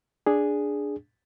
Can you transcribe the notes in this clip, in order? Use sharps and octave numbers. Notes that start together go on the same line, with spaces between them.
D4 G#4